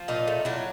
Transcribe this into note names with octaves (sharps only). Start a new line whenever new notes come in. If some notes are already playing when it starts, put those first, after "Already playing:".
Already playing: F3
A#2 D#4 F4
A3
F#3 D4 E4